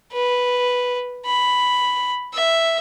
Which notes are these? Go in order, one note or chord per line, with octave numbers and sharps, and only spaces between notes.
B4
B5
E5